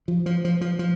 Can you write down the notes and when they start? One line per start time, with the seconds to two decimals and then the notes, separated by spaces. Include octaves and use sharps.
0.08 F3
0.26 F3
0.45 F3
0.61 F3
0.79 F3